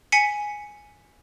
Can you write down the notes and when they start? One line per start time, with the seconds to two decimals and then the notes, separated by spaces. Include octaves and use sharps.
0.12 G#5 B6 C#7